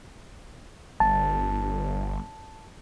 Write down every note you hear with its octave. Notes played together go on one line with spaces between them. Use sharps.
G1 A5